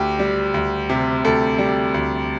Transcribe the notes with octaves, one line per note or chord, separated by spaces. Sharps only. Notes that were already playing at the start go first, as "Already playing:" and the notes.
Already playing: D2 G4
G3
D2
C3
D2 A4
G3
D2